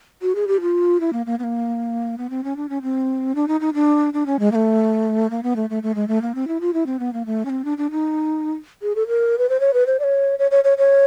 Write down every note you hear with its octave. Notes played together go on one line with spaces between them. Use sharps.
F#4
G#4
G4
F4
E4
A#3
A#3
B3
A#3
B3
C4
C#4
D4
C#4
C4
D4
D#4
D#4
D4
D4
C#4
G#3
A#3
A3
A#3
B3
A3
A3
A3
G#3
A3
A#3
C4
E4
F4
E4
C4
B3
A#3
A3
C#4
C4
D4
D4
D#4
G#4
A4
A#4
B4
C5
C#5
B4
C5
D5
C#5
C#5
C#5
C#5
C#5